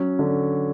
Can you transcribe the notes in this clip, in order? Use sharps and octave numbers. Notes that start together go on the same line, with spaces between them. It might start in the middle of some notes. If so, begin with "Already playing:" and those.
Already playing: F#3 C#4
D3